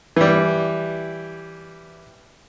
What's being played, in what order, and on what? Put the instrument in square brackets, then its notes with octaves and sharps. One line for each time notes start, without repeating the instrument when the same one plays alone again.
[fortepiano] E3 G3